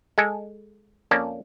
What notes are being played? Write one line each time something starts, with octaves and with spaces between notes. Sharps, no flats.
G#3 A4 G#5
F2 A#3 C#4 D5 A5